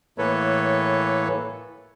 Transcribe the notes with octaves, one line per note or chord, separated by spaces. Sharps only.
A2 E3 A#3 A4 B4 C#5